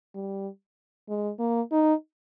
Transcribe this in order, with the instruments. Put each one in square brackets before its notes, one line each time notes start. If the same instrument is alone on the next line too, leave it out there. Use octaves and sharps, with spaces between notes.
[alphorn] G3
G#3
A#3
D#4